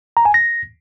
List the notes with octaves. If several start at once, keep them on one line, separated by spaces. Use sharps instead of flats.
A#5
G#5
A#6